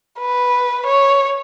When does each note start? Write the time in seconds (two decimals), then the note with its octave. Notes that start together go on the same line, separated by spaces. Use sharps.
0.20 B4
0.86 C#5